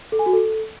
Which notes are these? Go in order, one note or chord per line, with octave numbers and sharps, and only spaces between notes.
A4
G#5
F#4
A4